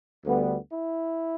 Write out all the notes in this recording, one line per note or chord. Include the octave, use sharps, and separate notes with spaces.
D2 D3 G3 B3
E4